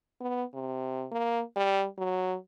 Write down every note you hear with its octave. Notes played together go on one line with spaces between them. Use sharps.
B3
C3
A#3
G3
F#3